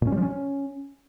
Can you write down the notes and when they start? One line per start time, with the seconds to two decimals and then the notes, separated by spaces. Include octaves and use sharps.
0.02 A#2
0.07 C#4
0.12 G3
0.17 F3
0.22 C#4